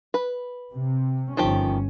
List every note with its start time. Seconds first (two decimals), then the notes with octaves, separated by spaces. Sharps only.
0.14 B4
0.73 C3
1.37 G1 D#3 F3 C#4 G4